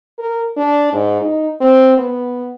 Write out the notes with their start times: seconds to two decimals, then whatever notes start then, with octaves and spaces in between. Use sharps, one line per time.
0.19 A#4
0.57 D4
0.93 G#2
1.22 D#4
1.61 C4
1.98 B3